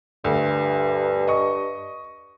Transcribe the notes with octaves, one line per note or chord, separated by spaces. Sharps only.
D2 G2
D#5 C#6